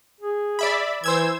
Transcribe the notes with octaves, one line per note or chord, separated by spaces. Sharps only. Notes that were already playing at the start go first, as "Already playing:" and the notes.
G#4
D5 E5 B5
E3 C5 E6 G#6